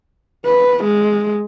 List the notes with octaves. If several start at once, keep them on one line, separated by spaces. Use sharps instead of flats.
B4
G#3